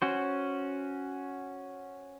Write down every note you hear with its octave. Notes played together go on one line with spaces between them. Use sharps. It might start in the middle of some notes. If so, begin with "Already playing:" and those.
C#4 F#4 C5